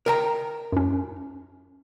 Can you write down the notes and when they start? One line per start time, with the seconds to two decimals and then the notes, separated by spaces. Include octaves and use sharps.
0.06 A#4 G5 A#5
0.72 F#2 C#4